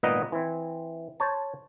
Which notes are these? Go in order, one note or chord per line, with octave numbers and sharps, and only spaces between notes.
G#1 A#2 B3 D#4 B4 D#5
E3 C4
C5 C#5 A5